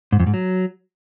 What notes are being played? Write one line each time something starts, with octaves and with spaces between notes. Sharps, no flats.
G#2
F2
G#2
F#3